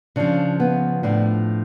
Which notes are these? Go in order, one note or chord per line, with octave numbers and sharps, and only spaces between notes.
C#3 F3 D4
B3
A2 F3 D4